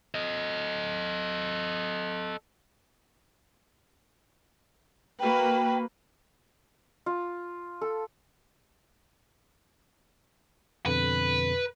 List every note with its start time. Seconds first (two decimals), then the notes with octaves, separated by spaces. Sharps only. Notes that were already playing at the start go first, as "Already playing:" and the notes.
0.15 A4 D#5
5.20 A#3 F#4 B4 G5
7.06 F4
7.81 A4
10.86 F2 B2 D3 B4